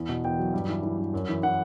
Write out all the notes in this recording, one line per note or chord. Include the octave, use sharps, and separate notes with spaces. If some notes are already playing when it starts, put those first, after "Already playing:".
Already playing: E2
B2
E2 G5
F#3
G2
E3
E3
G2
F#2
E3
E3 F#5